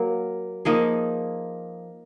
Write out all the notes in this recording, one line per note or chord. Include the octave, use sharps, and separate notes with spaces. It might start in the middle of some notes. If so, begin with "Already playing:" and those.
Already playing: F#3 A#3 A#4
F3 A#3 D#4 G#4